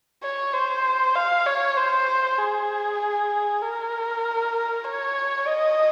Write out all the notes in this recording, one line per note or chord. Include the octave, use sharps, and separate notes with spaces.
C#5
C5
F5
C#5
C5
G#4
A#4
C#5
D#5